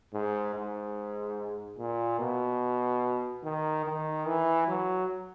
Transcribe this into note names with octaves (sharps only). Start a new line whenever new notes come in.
G#2
G#2
A#2
B2
D#3
D#3
E3
F#3